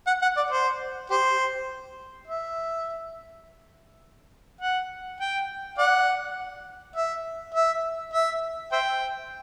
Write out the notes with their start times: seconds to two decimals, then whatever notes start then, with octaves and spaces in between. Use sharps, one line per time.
0.07 F#5
0.22 F#5
0.37 D5
0.50 C5
1.10 G4 C5
2.27 E5
4.61 F#5
5.20 G5
5.78 D5 F#5
6.96 E5
7.55 E5
8.13 E5
8.72 C5 E5 G5